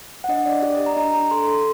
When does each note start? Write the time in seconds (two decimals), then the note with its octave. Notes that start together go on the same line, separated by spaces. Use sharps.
0.24 F#5
0.29 D4 D#5
0.45 D4 D5
0.62 G4 D5
0.75 D#5
0.79 G4
0.86 A#5
0.96 D4 A#5
1.13 D4 A#5
1.31 A4 C6
1.47 A4 C6